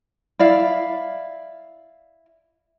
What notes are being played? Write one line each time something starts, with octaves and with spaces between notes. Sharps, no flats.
E4 D5 F5